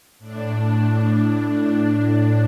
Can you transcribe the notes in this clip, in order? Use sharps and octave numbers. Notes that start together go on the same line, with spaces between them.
A2 D4